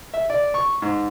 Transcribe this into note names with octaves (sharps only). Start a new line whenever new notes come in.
E5
D5
C#6
G#2